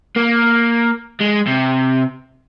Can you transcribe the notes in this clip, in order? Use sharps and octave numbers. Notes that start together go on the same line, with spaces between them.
A#3
G#3
C3